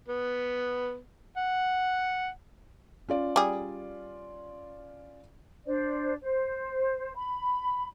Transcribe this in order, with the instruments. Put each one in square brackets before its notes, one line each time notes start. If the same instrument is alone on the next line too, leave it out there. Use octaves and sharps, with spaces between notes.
[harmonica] B3
F#5
[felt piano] C#4 F4 D5
[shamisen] G3 G#4
[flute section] D4 C5 D5
C5
B5